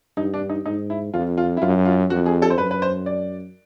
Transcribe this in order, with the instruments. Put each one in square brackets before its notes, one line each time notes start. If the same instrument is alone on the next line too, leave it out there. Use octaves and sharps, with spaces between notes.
[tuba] G2 [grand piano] D#4
[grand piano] D4
D#4
[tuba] G#2 [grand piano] D#4
[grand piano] E4
[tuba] F2 [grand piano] F4
[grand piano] F4
E4
[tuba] F#2 [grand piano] F4
[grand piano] F4
[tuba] F2 [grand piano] F#4
[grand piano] G#4
A4
C5
[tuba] F#2 [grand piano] B4
[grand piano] B4
C5
D5